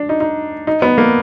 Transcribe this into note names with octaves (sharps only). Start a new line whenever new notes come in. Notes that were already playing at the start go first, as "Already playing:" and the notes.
Already playing: D4
D#4
D#4
D#4
B3
A#3